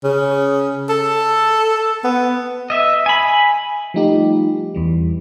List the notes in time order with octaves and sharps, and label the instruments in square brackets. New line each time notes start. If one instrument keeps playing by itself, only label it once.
[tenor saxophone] C#3
A4
B3
[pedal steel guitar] D#5 E5
G#5 B5
[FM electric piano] F3 G3 A3 D#4 F4 G4
E2 E3 G3